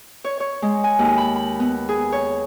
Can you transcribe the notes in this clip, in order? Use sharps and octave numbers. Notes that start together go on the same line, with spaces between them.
C#5
C#5
G#3
G#5
D#2
B5
B5
B3
G#4
C#5